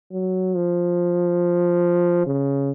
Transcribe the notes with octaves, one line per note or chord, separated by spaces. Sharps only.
F#3
F3
C#3